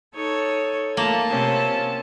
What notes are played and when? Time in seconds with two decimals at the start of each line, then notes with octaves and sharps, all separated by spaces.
0.14 D#4 A4 C#5
0.97 A3 A#3 F4 A5
1.28 C3 C4 C#4